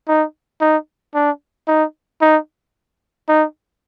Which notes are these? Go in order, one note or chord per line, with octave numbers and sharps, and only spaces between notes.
D#4
D#4
D4
D#4
D#4
D#4